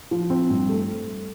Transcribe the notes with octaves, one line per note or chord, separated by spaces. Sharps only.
F3
C4
G2
A3